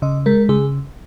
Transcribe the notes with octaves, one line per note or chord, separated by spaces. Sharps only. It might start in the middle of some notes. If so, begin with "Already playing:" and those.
C#3 D#5
G#3 A#4
C#3 G#4